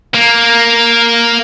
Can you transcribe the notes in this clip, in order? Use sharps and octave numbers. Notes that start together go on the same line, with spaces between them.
A#3